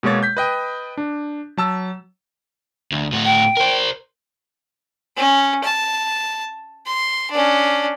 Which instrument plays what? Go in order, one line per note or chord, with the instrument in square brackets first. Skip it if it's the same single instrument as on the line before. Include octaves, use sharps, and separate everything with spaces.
[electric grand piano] B2 G#3 A#3 C#5 A6
G6 B6
B4 D#5 G5
D4
F#3 A5 E6
[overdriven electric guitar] D2
A2 F#4
[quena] G5
[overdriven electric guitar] A#4 C5
[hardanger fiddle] C#4
A5
C6
C#4 D4